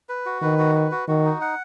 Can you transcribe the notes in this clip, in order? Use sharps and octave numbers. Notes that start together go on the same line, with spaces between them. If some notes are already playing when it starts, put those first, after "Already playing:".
B4
F#4
D#3 B4
F#4
B4
F#4
D#3 F#4
D#4
F#5